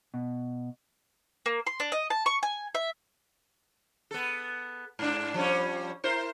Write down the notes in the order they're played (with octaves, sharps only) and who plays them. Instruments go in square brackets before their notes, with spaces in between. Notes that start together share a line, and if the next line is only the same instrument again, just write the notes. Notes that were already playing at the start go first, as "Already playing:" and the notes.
[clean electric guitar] B2
[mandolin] A#3
C6
D4
D#5
A5
C#6
G#5
E5
[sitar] B3 A4
G#2 D4
F3 G3 C#4
E4 A#4 C5